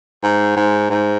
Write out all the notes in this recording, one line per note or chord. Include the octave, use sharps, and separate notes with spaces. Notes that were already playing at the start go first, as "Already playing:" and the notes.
G#2
G#2
G#2